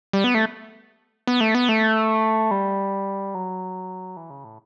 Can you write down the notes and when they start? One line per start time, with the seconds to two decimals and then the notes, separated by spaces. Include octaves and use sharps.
0.13 G3
0.24 B3
0.34 A3
1.27 B3
1.41 A3
1.55 B3
1.69 A3
2.51 G3
3.35 F#3
4.17 E3
4.30 C#3
4.44 A2